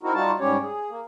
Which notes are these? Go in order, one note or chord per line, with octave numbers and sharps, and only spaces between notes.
C4 D#4 E4 F#4 A#4
G3 D#4 F4 F#4 A5
G#2 G3 C#4 G4 C#5
G#4
A#3